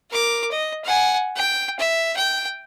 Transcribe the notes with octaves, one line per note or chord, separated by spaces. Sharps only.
A#4 D6
D#5
F#5 G#5
G5
E5
G5